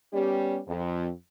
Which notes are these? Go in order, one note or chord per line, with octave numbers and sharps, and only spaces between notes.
G3 B3 C#4 G4
F2